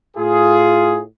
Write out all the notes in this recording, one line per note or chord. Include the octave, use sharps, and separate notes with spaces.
A2 F4 G#4